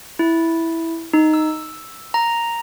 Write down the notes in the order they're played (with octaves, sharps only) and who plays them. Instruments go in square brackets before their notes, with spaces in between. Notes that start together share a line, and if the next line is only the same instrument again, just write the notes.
[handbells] E4
D#4
E6
A#5